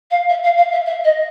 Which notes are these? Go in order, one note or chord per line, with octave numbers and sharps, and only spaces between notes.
F5
E5
F5
F5
E5
E5
D#5